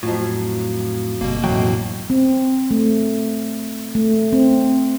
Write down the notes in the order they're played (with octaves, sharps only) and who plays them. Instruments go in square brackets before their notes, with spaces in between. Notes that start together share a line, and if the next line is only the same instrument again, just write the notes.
[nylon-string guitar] F2 F#3 F4 [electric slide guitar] A2
[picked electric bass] G1 [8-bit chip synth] B2 A#3
[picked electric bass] F2 F#3 [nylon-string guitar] A2 D#3 A3 [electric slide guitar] E3 F#4 G5
[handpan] C4
A3
A3
C4